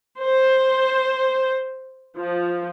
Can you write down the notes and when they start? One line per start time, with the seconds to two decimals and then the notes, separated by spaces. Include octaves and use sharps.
0.21 C5
2.17 F3